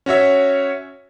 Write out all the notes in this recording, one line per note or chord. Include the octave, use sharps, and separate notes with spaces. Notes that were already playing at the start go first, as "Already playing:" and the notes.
C#4 F#4 C#5 E5